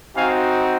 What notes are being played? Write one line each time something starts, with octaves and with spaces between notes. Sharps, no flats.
C4 D#4 F#4 F5 G#5